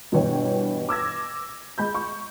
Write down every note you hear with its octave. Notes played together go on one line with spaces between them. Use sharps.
G2 B2 E3 C#5 G5
D6 E6 G#6 A#6
G#3 B5 G6
C#6